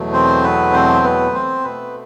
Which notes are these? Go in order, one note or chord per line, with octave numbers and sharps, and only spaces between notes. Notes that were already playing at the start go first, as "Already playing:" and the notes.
Already playing: E2 B2 F#3 A3
C4 C5
B3 B4
C4 C5
B3 B4
C4 C5
B2 A3 B3 B4